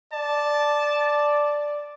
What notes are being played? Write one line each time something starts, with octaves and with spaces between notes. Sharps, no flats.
D5 A5